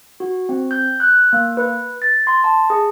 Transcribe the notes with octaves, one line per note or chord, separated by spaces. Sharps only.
F#4
C4
G6
F#6
A#3
B4
A6
C6
A5
G#4